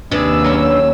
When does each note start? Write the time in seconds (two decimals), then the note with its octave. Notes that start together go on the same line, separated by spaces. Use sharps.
0.11 D#2 C3 D4 G#4 B4 E6
0.44 F#3 A#3 C#4